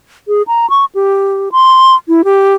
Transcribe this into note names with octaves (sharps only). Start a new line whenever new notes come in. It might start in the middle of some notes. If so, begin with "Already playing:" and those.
G#4
A#5
C#6
G4
C6
E4
G4